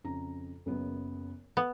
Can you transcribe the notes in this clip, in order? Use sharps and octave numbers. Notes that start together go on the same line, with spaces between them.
F2 C#3 A#5
F#1 F#2 B3
B3